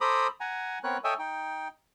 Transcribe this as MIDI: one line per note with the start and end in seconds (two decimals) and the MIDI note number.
0.01 0.27 69
0.01 0.27 72
0.01 0.27 82
0.01 0.27 83
0.01 0.27 86
0.01 0.27 87
0.40 0.79 78
0.40 0.79 80
0.40 0.79 82
0.84 0.98 59
0.84 0.98 60
0.84 0.98 70
0.84 0.98 71
0.84 0.98 73
0.84 0.98 90
1.04 1.14 69
1.04 1.14 73
1.04 1.14 75
1.04 1.14 76
1.04 1.14 79
1.04 1.14 80
1.19 1.68 63
1.19 1.68 79